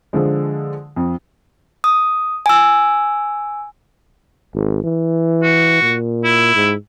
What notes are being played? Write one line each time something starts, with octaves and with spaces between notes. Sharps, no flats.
D3 F3 G#3
F2
D#6
G#5 E6
G#1
E3
F#4
A#2
E4
G#2